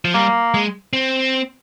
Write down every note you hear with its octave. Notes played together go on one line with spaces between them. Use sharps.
F3
G3 A#3
G#3
C4